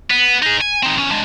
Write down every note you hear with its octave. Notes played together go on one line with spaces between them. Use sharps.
B3
D#4 G#4
G#5
C4 D#4
E2 C#4
G#3 D4